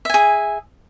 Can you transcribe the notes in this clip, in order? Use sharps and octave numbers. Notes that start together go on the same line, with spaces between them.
G#4 E5 G#5